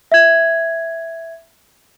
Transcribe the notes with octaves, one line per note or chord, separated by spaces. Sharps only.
E5 G#6